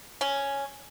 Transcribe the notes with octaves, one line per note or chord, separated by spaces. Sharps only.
C#4